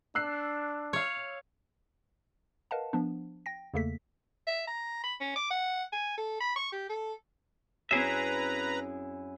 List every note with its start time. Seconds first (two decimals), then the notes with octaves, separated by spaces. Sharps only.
0.15 D4 E6 F#6 C7
0.93 C#5 F5
2.71 A#4 B4 D#5 F5 F#5 A5
2.93 F3 B3 D4
3.46 G5 A#6
3.74 E2 C#3 A3 A#3 A4 B6
4.47 E5
4.67 A#5
5.04 B5
5.21 C#4
5.36 D6
5.50 F#5
5.93 G#5
6.18 A4
6.41 B5
6.56 C#6
6.72 G4
6.89 A4
7.91 F#2 C4 E4 G#4 B4 E5 A#5